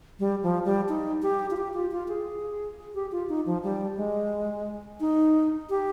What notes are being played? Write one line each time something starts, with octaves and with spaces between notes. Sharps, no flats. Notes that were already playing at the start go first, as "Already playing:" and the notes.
G3
F3
G3
D#4
G4
F4
G4
F4
F4
G#4
G4
F4
D#4
F3
G3
G#3
D#4
G4